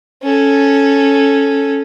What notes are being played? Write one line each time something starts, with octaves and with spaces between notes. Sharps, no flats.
C#4 A4